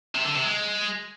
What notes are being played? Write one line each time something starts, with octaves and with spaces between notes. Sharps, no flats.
C3
D3
C3
G#3